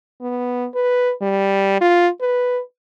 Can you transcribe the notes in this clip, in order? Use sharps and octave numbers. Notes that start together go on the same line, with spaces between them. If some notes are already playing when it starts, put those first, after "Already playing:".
B3
B4
G3
F4
B4